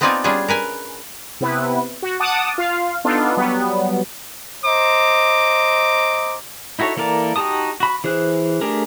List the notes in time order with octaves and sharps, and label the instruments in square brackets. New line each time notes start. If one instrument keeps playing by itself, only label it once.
[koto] B3 C4 D#4 F4 D5 G#5
G3 C#4 D4 F4 G#4
A#4 B4 G#5
[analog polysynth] C3 B3 E4 B4
F#4
F#5 A5 D6 D#6
F4 F5
B3 D4 D#4 F4 A4
F#3 G3 B3
[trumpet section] C5 D#5 A#5 D6
[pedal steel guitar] D#4 E4 F#4 A4 C#5
E3 A#3 A4 A#4 D5
D#4 F#4 G4 A5 D#6
F#4 B5
E3 G#4 C5 F#6
A3 D4 G4 G#4 A#4